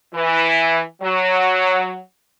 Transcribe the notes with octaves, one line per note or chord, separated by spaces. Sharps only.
E3
F#3